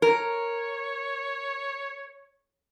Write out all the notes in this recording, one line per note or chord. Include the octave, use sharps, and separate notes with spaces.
A#4 C#5